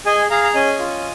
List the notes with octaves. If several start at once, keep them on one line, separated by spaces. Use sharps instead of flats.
G#4 D#5 G#5
G#4 F5 A#5
A#5
C#4 D#5 G#5
F4